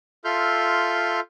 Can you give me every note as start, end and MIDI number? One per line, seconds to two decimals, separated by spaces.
0.25 1.20 65
0.25 1.20 69
0.25 1.20 76
0.25 1.20 84
0.25 1.20 89
0.25 1.20 91